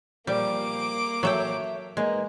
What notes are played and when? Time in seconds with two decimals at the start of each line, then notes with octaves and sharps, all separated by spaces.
0.27 A#2 F3 G3 A#3 D6
1.23 F#3 A4 C#5 E5 G5
1.97 G#3 A#3 B3 D#4